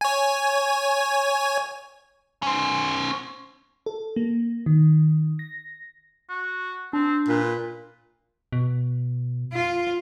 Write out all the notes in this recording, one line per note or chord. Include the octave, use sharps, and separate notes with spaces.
C#5 G#5
C#4 C5
A4
A#3
D#3
A#6
F#4
C4 D4
A#2 B4
B2
F4